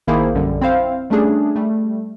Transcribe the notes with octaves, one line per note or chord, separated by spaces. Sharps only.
A1 D#3 A#3 E4 G#4 C5
A#1 F#2 D3 G3
C4 E4 C5 F5
G3 A3 C#4 D4 G#4
G3 A3